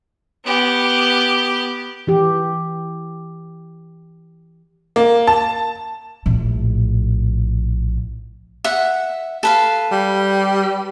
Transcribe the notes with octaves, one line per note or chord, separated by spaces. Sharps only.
B3 G4
E3 G4
A#3
A5
A#1 A2
E5 F#5
A4 B4 F5
G3